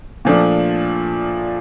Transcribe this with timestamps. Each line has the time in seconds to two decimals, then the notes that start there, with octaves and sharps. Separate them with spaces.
0.25 A#2 F3 A3 D4